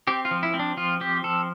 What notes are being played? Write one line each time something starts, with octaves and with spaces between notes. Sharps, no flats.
C4 G4
F4
F3
E4
C4
D4
F3 F4
C4 G4
F3 A4